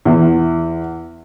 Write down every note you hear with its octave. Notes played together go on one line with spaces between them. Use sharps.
E2